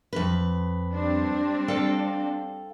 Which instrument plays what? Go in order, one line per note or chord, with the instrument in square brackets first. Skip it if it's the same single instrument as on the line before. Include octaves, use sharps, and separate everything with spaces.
[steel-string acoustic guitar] F2 B4
[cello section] G3 C4 D4
[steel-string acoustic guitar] A4 F5 G5